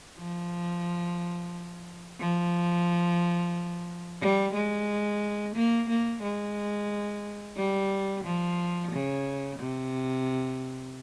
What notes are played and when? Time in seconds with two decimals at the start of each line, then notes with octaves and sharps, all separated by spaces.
0.17 F3
2.20 F3
4.21 G3
4.54 G#3
5.55 A#3
5.89 A#3
6.22 G#3
7.57 G3
8.24 F3
8.92 C#3
9.59 C3